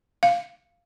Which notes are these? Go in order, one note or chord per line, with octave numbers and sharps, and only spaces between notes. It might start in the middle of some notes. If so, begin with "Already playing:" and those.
F5